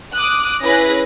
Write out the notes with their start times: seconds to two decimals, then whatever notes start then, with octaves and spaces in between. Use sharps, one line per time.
0.14 D6 D#6 F#6
0.63 C#4 E4 G#4 B4 F#6 A#6